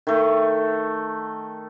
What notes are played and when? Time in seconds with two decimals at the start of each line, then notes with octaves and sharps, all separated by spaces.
0.07 D#3 A3